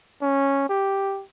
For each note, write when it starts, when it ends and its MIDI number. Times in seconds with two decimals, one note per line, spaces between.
0.22 0.67 61
0.69 1.23 67